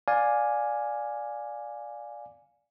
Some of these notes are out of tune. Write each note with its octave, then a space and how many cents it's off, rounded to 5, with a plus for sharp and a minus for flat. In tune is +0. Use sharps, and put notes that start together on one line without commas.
D5 +0 F5 +15 G#5 +0